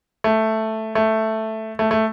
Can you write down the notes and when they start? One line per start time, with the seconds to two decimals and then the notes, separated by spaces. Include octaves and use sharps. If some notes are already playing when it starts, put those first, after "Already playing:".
0.24 A3
0.95 A3
1.79 A3
1.91 A3